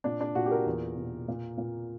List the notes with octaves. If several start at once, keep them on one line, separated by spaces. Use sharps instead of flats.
A#2 D4
D4
A#2 F#4
G4
A#4
E2
B2
A#2
A#2